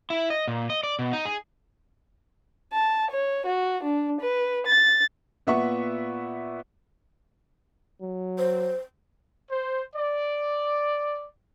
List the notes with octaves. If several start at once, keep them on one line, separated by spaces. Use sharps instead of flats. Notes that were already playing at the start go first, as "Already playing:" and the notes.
E4
D#5
A#2
D#5
D5
B2
D#4
G#4
A5
C#5
F#4
D4
B4
A6
A#2 B3 E5 F#5 C#6
F#3
C5
C5
D5